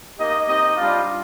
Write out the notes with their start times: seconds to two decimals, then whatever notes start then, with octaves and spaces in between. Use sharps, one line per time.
0.18 A#3 D#4 G4 D#5
0.48 C4 D#4 G4 D#5
0.77 G3 D4 F4